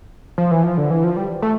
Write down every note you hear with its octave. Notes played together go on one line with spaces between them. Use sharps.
F3
E3
F3
D3
E3
F3
G3
A3